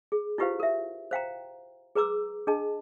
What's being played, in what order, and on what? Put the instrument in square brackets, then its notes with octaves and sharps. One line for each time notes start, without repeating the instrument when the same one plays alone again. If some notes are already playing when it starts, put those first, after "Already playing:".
[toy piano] G#4
E4 F4 G4 B4 C5 F5
A#4 E5
C5 F5 G5 A#5
G#4 B4 A#5 D6 E6
D4 G#4 D#5 A5